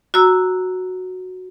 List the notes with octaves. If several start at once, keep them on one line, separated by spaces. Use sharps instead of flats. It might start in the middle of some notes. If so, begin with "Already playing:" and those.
F#4 A#5 E6